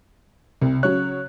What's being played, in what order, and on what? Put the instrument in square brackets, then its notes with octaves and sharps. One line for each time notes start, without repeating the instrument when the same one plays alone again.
[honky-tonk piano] C2 [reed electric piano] C3
[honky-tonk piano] C#3 F#3 C#5 [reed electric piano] F#6